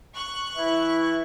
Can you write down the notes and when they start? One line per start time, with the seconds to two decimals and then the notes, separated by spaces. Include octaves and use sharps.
0.14 C#6 F#6
0.56 E3 E4 E5